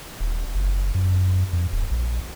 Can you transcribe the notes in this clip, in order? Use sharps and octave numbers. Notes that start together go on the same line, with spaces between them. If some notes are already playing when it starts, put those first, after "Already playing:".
D#1
F#1
F#2
F2
D1
A#1